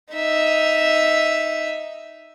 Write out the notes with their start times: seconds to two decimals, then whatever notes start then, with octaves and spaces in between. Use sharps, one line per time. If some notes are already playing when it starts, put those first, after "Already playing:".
0.12 D#4 E5